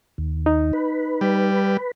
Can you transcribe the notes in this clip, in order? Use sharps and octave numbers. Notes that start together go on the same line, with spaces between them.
D#2
D#4
B4
G3